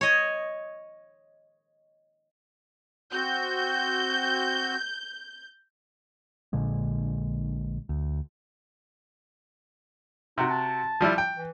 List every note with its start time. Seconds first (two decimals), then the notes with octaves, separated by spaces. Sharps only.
0.01 C#5 D#5
3.13 C4 F#4 G6
6.53 A#1 A#2 D3 G#3
7.89 D2
10.38 C3 D#4 F#4
10.50 A5
11.01 F3 G3 E4
11.18 G5
11.37 E3